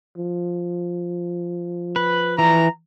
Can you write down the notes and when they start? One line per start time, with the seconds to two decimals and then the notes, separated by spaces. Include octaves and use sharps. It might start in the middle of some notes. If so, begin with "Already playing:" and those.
0.18 F3
1.96 B4
2.38 E3 A#5